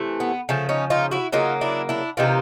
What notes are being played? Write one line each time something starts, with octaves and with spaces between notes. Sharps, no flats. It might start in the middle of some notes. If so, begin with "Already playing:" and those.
Already playing: C3 E3 A3
B3
C#3 F3 A3
C#4 D#4
D#4 F4
E4 F#4
C#3 F#3 A#3 D#4 F4
D4 E4
D4 E4
C3 E3 G3 A#3 D#4 F4